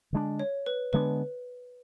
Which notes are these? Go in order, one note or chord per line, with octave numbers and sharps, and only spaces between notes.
D3 G#3 B3 D4
C#5
B4
D3 G#3 B3 D4 B4